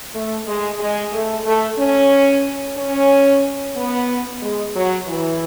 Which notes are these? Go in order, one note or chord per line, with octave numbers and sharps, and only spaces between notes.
A3
G#3
G#3
A3
A3
C#4
C#4
B3
G#3
F#3
E3